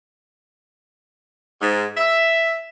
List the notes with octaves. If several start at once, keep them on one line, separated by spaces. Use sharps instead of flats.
G#2
E5